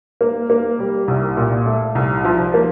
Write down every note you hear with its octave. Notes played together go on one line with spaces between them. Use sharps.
A#3
A#3
G3
C2
A#2
A3
C2
F3
A#3